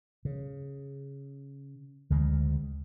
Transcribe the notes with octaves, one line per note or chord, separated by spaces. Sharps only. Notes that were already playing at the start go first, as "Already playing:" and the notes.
C#3
D2 C#3 G#3